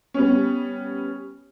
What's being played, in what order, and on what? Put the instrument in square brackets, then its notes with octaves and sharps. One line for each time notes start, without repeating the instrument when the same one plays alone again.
[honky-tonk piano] G3 B3 C#4